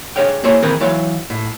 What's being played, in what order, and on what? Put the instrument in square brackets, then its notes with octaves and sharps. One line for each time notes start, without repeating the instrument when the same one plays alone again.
[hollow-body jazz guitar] D4 E4 G#4 C#5 F5 G5
A#3 E4 G#4 C5 C#5 E5
D#3 E3 C4 G#4 A#4 B4
E3 F#3 E4 C#5 F5
A2